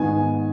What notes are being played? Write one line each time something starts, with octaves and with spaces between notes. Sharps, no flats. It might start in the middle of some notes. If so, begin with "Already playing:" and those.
Already playing: G#2 D#3 B3 G#5